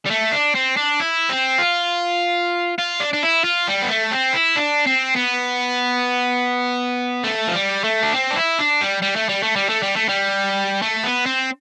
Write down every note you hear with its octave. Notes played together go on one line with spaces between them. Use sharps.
G3
A3
D4
C4
D4
E4
C4
F4
F4
D4
D4
E4
F4
G3
B3
A3
C4
E4
D4
C4
B3
A3
F3
G3
A3
D4
C4
D4
E4
D4
G3
G3
A3
G3
A3
G3
A3
G3
A3
G3
A3
B3
C4